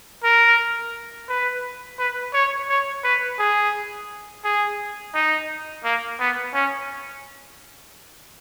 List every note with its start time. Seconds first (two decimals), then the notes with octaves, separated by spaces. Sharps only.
0.24 A#4
1.29 B4
1.99 B4
2.34 C#5
2.69 C#5
3.04 B4
3.39 G#4
4.44 G#4
5.15 D#4
5.84 A#3
6.20 B3
6.54 C#4